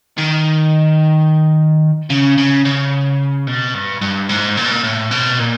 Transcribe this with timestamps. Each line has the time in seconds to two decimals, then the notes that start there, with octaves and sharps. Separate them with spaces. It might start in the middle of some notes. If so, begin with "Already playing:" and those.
0.18 D#3
2.10 C#3
2.38 C#3
2.65 C#3
3.47 B2
3.74 G2
4.01 G2
4.29 G#2
4.57 A#2
4.64 B2
4.71 A#2
4.84 A2
5.11 B2
5.39 A#2